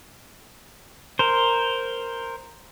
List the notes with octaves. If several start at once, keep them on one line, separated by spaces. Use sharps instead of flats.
A#4 C5